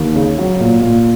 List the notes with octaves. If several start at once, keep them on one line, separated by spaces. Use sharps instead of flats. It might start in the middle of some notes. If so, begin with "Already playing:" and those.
Already playing: D#2
C#3
F#3
A#2
A#2